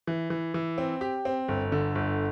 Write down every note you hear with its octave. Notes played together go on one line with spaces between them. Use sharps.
E3
E3
E3
C4
G4
C4
G1
D3
G1